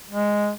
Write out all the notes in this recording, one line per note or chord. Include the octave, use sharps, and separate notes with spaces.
G#3